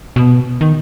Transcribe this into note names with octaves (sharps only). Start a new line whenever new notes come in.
B2
D#3